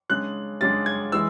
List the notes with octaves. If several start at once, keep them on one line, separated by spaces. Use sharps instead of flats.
C#3 G#3 D4 F#6
C#3 G#3 D4 A6
G#6
E3 G#3 E6